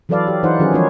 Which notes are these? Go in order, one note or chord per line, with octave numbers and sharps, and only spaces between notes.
E3 F#3 A4 B4 D5 F5
G4
E3 D#4 F4 C5 F#5
D#3 F#3 C#4 G#4
F3 G#3 C#4 D#4 B4 C#5